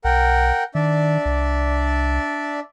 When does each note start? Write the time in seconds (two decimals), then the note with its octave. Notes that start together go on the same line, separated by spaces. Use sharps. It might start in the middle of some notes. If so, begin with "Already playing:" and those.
0.05 B1 A#4 F#5 G5
0.75 D#3 D4 D5 E5
1.26 C2